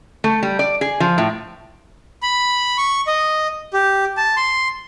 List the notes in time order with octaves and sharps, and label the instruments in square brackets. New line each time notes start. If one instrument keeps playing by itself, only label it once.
[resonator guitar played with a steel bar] A3
G3
D5
G#4
F3
A2
[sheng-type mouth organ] B5
C#6
D#5
G4
A5
C6